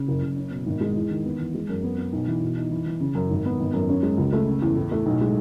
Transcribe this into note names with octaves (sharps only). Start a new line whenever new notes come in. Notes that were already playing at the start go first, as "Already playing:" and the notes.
Already playing: C#3
F#1
F#1
C#4
B2
G#1
G#3
E2
D#3
B3
E3
G#3
F#2
B3
B3
B1
E3
B2
D#4
E3
E3
C#3
F#2
G#1
B3
G#1
F#2
C#4
G#3
C#2
A3
C#3
E2
A2
A3
B1
G#3